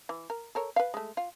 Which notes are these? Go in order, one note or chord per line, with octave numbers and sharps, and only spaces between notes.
E3
A#4
A4 A#4 C#5
B4 F5
G#3 A3
F4